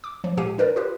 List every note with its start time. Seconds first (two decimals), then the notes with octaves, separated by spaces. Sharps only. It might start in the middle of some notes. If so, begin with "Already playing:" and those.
0.04 D6
0.24 F3
0.37 A#2 G#3 G4 F5 G#5 D#7
0.58 D4 A#4 B4 D5
0.76 F4 G4 B4